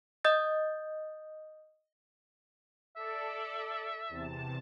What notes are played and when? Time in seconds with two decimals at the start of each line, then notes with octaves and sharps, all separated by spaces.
0.24 D#5 D#6 G6 A6
2.96 A4 D5 E5
4.09 E2 C3 A5